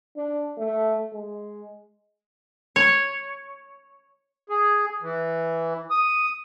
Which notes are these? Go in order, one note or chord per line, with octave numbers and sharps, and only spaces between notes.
D4
A3
G#3
C#5
G#4
E3
D#6